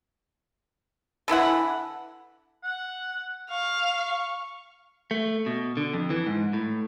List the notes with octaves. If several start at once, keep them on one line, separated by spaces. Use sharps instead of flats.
D3 E3 E4 F#5
F#5
F5 C#6
A3
B2
D3
F2
E3
G#2
A2